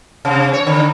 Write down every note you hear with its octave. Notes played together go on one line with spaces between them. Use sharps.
C3
C#5
D3